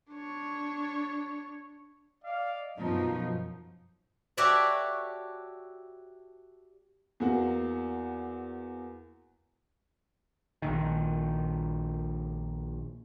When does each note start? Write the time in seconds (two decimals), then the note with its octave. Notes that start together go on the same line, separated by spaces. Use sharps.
0.12 D4 C#5
2.24 D5 D#5 F5
2.79 F#2 B2 F3 D#4
4.37 F#4 G4 A4 C#5 D5 E5
7.20 E2 A#3 F#4
10.62 A#1 D#3